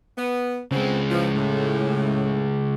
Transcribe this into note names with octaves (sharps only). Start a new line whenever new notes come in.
B3
F2 C#3 G#3 B3 C4
E3 F3
A2